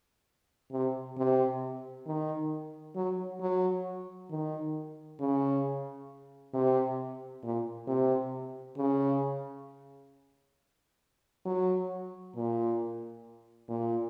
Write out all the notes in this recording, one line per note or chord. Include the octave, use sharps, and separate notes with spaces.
C3
C3
D#3
F#3
F#3
D#3
C#3
C3
A#2
C3
C#3
F#3
A#2
A#2